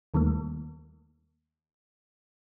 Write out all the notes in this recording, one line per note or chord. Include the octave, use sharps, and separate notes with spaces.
D#2 D#3 G3 A3 A#3